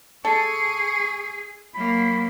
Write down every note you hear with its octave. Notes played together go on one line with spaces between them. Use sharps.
G#4 A4 C#6
F#3 A#3 B5